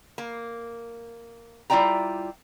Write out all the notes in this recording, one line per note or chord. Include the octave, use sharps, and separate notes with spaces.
A#3
G3 E4 F4 D5 G5 A#5